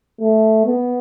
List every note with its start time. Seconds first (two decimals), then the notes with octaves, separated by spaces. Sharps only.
0.21 A3
0.66 B3